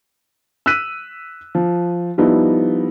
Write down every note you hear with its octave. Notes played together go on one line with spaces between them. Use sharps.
E6 F#6 B6 D#7
F3
F3 G3 B3 D#4 E4